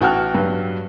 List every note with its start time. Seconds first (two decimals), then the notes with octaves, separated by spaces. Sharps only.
0.01 A1 F#4 G5 A5 F6 F#6
0.34 G2 F#3